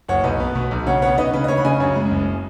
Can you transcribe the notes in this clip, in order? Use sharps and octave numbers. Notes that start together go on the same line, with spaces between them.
F#1 C#5 F#5
B1 B4 D#5
B3
B2
B1
C#3 C#5 F#5
B3 C#5 F#5
D#4 B4 D#5
C#3 B4
D#5
C#3 C#5
B5
C#3 D#5 G#5
F#2 C#5
G#3
F#1